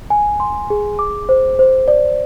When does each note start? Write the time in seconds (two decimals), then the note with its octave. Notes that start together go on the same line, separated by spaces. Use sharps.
0.10 G#5
0.40 C6
0.70 G#4
0.99 D6
1.29 C5
1.59 C5
1.88 D5